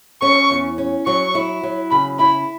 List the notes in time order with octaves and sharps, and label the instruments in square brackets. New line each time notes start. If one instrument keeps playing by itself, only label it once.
[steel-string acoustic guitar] C#4 [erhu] C#6
[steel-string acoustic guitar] E2
C#4
[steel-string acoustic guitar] F#3 [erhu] C#6
[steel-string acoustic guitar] E4
F#3
[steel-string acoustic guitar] C#3 [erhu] B5
[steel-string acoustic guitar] E4 [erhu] B5